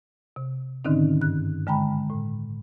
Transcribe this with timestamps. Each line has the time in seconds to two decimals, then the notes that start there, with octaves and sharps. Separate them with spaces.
0.36 C3
0.85 G#2 D3 D#3 C4 C#4 D#4
1.21 G2 F#6
1.67 D3 G#3 G5 A#5 B5
2.10 A2